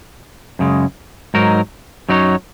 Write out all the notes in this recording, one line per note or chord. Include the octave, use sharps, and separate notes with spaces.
F#2 C#3 G#3
G#2 F#3 D#4 A#4
F#2 F#3 D#4 A#4 C#5